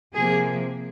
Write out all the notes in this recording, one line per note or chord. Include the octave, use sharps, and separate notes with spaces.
C3 F3 A#3 G#4